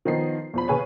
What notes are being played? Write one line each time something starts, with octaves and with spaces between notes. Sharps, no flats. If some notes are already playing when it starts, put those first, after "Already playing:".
D#3 F3 B3 D#5 C7
E2 F3 B5
C#3 C#4 G#4 B4 C#5